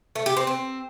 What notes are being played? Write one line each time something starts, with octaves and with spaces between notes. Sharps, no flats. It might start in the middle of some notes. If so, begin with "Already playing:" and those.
A3
G4
C4
C4